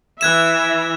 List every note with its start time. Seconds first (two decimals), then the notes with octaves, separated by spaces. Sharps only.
0.21 E3 E5 F#6 G#6 E7